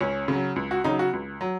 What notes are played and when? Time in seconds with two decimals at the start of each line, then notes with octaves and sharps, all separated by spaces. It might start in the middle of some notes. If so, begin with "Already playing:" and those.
0.01 C#2 C#4
0.28 C#3 F#3
0.56 C#2
0.71 F#4
0.84 C#3 F#3 D#4
0.99 F#4
1.13 C#2
1.41 F#3